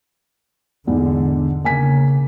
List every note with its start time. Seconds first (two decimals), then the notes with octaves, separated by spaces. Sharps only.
0.87 E2 G#2 D3
1.64 C#3 A#3 G#5 B6